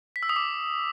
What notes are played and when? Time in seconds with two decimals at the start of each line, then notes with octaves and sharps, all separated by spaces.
0.16 B6
0.23 E6
0.29 D#6
0.36 D6